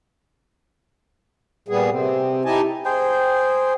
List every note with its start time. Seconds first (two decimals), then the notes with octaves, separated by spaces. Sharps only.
1.68 A#2 G3 B3 G#4
1.90 C3 C4
2.45 D#4 E4 G4 D#5 G#5 A5
2.85 G#4 C5 G5